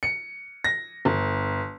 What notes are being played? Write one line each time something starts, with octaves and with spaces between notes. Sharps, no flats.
C#7
A#6
G1